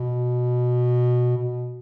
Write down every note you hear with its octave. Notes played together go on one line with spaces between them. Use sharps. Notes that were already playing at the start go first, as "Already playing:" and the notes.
Already playing: B2
B2